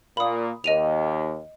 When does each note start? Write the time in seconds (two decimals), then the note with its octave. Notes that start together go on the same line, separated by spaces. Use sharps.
0.17 A#2 A#3 B5 D#6
0.64 D#2 D#5 D#7 F7